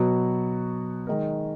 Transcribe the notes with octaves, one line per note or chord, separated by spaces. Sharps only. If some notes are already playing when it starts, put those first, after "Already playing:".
Already playing: B2 F#3 B3 F#4
D#3 G#3 D#4 A#4